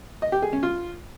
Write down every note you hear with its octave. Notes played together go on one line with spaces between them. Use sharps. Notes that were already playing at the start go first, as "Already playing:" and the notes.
D#5
G4
G#4
C#4
F4